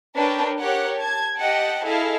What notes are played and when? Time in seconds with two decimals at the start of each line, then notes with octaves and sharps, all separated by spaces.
0.16 D4 A#4 B4 C#5 G5
0.60 G4 A#4 C#5 F#5 F#6
0.98 A5 G#6
1.38 G4 D#5 F#5 G5 A5
1.83 E4 G#4 A4 D#5 F5